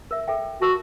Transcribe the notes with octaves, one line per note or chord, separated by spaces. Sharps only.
A#4 E5
A4 E5 G5
F#4 A#4 A5